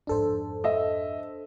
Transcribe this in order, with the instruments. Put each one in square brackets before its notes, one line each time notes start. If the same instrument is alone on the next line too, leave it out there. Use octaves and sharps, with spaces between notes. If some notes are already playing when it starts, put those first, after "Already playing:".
[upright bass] F2 G#2 [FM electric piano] D4 A4 C5
[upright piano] D#5 E5